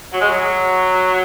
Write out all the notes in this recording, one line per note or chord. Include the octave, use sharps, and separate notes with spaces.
F#3
G#3
F#3